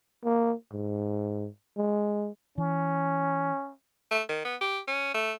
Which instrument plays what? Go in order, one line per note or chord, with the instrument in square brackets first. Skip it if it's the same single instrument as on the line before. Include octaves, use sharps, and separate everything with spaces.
[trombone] A#3
G#2
G#3
[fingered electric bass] E3 [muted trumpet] C#4
[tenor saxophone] A3
D#3
B3
G4
C#4
A3